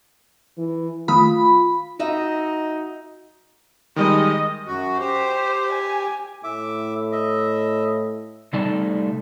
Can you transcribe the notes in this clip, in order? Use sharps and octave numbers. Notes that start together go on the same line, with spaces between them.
E3
D#3 A3 F4 B5 D#6
D#4 F#4 D#5 E5
D#3 G3 G#3 D#5
F#2 F#4
G4 C5
G#5
A2 E5 D6
D#5 E5
C3 G3 A3 D#4 D5 A5